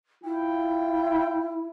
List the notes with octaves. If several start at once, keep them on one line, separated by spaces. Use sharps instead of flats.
E4 F4 G5